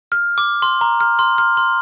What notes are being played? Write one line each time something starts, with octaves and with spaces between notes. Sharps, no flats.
F6
D6
C6
A#5
F6
C6
F6
C6